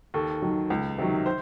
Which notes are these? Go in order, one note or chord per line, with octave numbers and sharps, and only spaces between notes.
D#2 A4
D#3 F#3
C#2
C3 D#3 F#3
C5